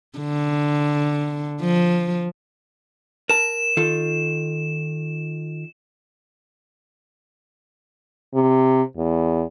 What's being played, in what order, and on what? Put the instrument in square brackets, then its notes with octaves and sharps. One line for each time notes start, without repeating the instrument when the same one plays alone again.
[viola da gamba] D3
F3
[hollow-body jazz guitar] A#4 A5 [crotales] E7
[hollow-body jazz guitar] D#3 F4 A4
[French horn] C3
E2